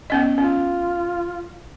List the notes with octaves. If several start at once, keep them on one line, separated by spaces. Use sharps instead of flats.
B3 C#4 D#5
C#4 F4